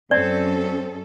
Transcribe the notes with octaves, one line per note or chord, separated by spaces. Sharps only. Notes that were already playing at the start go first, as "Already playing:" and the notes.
F#2 C4 C#4 A4 D5